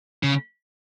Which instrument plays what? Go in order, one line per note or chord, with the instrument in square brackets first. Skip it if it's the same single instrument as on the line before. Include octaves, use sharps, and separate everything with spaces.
[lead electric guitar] C#3